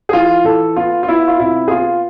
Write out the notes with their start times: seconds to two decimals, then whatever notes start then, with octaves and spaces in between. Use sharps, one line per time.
0.09 G#4
0.13 E3 F4
0.44 E3 A4
0.76 B3 F4
1.03 F4
1.08 B3 E4
1.28 F4
1.39 C3 E4
1.68 G#4
1.71 B3 F4